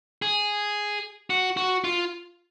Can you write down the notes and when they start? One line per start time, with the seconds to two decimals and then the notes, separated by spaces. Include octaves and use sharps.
0.22 G#4
1.30 F#4
1.57 F#4
1.84 F4